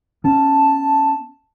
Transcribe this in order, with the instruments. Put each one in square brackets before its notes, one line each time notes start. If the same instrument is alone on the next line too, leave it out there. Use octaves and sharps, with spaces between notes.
[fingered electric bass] B3 C#4 [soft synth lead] A5